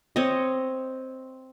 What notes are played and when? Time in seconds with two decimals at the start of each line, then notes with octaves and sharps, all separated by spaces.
0.16 C4 C#5 D#5